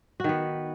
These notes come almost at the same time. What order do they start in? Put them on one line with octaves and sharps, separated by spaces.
F#4 D#3 B3